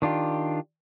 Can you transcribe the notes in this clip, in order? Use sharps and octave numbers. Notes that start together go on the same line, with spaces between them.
D#3 D4 F4 G4